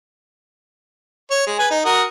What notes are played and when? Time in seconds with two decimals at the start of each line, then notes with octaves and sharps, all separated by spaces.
1.31 C#5
1.47 G#3
1.59 B4 G#5
1.71 D#4
1.85 F#4 A#4 D#6